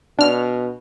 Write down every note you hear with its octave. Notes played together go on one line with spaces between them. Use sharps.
B2 D4 F6